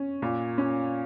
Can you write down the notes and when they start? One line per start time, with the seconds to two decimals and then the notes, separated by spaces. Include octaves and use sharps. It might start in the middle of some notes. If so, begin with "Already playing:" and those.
Already playing: C#4
0.22 A#2
0.58 C#4